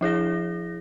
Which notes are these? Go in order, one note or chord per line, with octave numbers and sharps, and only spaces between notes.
F3 E4 G#4 A#6